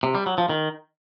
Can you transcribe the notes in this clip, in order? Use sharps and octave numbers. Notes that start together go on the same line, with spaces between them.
C3
G3
F#3
F3
D#3